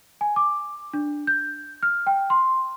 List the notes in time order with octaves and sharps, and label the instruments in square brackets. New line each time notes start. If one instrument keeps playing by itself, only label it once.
[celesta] G#5
D6
D4
G6
F6
G5
C6